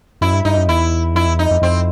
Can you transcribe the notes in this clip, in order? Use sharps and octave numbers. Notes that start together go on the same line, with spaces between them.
F#2 E4
G2
G2 D#4
F#2
E2 E4
F2 E4
E2
F2 D#4
F2
F2 C4